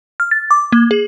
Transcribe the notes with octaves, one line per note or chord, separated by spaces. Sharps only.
F6
A6
D6
A#3
G#4